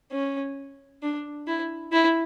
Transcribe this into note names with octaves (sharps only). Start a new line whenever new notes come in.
C#4
D4
E4
E4